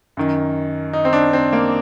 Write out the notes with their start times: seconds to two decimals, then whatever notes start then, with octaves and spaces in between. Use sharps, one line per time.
0.17 F#2 D#3
0.93 D#4
1.05 C4
1.13 D4
1.33 C4
1.53 A#3